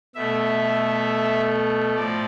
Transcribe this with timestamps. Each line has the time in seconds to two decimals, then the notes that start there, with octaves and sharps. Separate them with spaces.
0.15 B2 A3 E5
1.95 A2 F3 D5